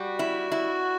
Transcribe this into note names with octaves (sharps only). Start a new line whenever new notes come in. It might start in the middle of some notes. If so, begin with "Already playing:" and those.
Already playing: G3 F#4
E4
E4